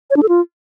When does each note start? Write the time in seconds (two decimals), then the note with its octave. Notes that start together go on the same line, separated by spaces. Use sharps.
0.10 C#5
0.16 D4
0.23 A4
0.29 F4